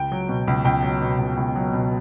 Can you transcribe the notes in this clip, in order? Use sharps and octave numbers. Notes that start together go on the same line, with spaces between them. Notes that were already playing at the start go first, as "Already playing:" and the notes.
Already playing: C#2 G5
F#3
B2
C#2
C#2 G5
F#3
B2
C#2
C#2
F#3
B2